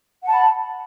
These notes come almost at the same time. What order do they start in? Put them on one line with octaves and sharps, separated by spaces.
F#5 A5 B5